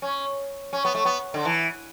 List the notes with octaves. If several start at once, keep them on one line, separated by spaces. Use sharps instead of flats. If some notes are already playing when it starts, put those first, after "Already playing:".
C#4
C#4
B3
A3
B3
D3
E3